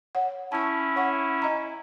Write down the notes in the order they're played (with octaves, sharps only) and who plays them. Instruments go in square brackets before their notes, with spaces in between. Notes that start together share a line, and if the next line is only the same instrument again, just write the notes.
[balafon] C#5 F#5
[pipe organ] C#4 E4 [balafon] A5 C#6
[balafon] C#5 F#5 C#6
D#5 A#5